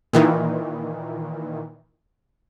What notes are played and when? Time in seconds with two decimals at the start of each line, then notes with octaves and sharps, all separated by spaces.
0.13 A#2 D#3 E3